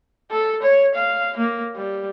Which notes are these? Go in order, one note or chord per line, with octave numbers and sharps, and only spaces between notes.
A4
C#5
F5
A#3
G3